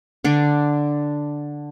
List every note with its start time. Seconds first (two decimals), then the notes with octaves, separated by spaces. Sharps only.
0.24 D3 D4